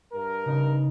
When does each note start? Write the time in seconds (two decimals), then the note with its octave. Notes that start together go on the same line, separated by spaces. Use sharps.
0.11 G2 A#4
0.45 C#3 D#4